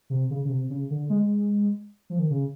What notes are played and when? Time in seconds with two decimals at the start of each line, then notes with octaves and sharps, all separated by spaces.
0.10 C3
0.30 C#3
0.45 C#3
0.49 C3
0.70 C#3
0.90 D3
1.10 G#3
2.10 F3
2.19 D#3
2.30 C#3